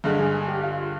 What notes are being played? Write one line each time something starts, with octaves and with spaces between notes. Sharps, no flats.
G2 D3 G#3 G#4
G#4
G#4
G4
F4
F4